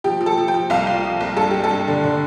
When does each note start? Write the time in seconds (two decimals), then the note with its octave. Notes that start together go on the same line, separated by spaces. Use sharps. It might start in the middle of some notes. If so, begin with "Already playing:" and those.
0.04 F3 G4
0.21 F3
0.26 A4
0.38 F3
0.48 G5
0.54 F3
0.70 C2 F5
0.87 C2
1.04 F3
1.21 C2
1.37 G2 A4
1.51 G2 G4
1.64 A4
1.71 G2
1.88 D3
2.04 D3